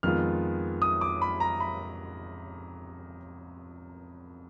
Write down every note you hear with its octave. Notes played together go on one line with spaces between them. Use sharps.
F2 D#3 G#3 B3 F4 F6
D#6
D6
B5
A#5
B5